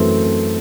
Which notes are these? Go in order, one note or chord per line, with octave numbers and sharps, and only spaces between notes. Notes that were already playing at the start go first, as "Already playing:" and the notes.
Already playing: F#2 E3 A3 C4 A4